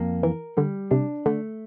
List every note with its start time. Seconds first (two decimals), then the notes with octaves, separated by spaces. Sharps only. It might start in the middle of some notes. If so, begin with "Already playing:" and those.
Already playing: F2 A#3
0.23 E3 A#4
0.57 D3 G3
0.91 C3 D4
1.26 D3 A3